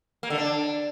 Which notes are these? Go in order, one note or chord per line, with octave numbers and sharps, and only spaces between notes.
A#3
D3
D4